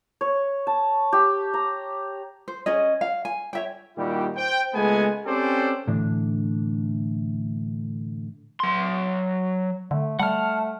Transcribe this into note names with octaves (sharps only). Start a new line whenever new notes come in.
C#5
A5
G4
A#5
C5
C#4 G#4 D#5
F5
G#5
C#5 E5 G5
A#2 D#3 G3 E4 F#4 G4
C5 G5
C#2 G#3 A3 B3 G#5
C4 C#4 G4 A4 C5 D5
A2 D3 E3 D4
F#3 C6
D3 A3
G3 A3 F#5 A5 F6